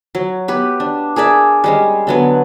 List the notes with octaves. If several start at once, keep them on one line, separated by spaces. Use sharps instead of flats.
F#3
B3 G4 B4
D4
G#4 A#4 D5 E5
G3 G#3 C#4
D3 F#3 B3